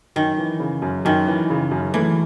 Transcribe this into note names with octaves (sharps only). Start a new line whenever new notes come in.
F#2 D#3
E3
C#3
F#2
F#2 D#3
E3
C#3
F#2
E3 A3